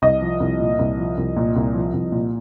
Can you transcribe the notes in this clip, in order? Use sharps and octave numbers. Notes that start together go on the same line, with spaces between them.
C2 D#5
F3
C2
A#2
C2
F3
C2
A#2
C2
F3
C2
A#2